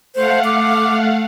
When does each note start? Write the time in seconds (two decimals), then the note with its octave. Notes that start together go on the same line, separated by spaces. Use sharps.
0.15 A3 C5 F5 F#5
0.44 D6